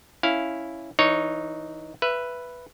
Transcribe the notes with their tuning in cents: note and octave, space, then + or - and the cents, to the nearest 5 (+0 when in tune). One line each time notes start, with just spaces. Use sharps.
C#4 +0 E4 +0 F5 +0
E3 -25 D#4 -10 C#5 +5
B4 +0 E5 +20